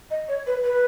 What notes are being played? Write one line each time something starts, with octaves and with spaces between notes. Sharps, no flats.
D#5
C#5
B4
B4